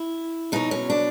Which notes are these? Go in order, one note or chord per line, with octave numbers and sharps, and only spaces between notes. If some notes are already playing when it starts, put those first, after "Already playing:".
Already playing: E4
B2 F#3 D#4
C#4
D4